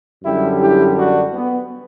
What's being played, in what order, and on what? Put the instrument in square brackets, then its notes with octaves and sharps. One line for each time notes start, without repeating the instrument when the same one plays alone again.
[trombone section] F#2 D3 G3 E4 G4
E4 G4
D4 F#4
B3